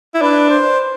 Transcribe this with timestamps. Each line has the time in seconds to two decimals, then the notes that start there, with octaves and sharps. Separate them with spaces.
0.15 E4
0.21 D4 B4
0.49 C5